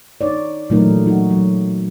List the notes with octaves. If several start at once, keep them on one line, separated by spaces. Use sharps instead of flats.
D#4 C#5 D5
A#2 E3 F#3 A3 D#4 A#4
F#3 D#4 F#4
F#3